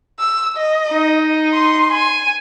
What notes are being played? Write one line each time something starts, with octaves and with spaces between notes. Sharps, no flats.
E6
D#5
D#4
C6
G#5